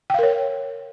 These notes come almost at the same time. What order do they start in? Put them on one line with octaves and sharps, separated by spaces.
G5 F5 A#4 C#5